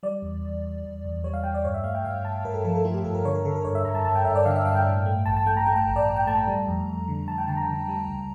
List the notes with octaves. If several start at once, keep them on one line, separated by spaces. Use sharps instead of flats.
G3 D5
E2
E2
E2
E2
E2
G3 C#5
F5
G3 G5
D5
G2 C#5
E5
A3 F5
G5
G2 F5
G2 A5
G2 A#4
A4
F3 A#4
A4
A3 F4
G4
G2 A4
A#4
D3 C#5
A#4
D3 A4
A#4
G2 C#5
E5
G2 A#5
A5
G2 A5
G5
G2 E5
D5
D3 F5
E5
G2 F5
G5
A2
A3
A1 A5
A5
A3 G5
A#5
A3 G5
G5
A1
D5
A1
G5
A3 A5
A#5
G3
F2
F2
D3
F2 A5
G5
D3 A5
A#5
D3
G3
C#2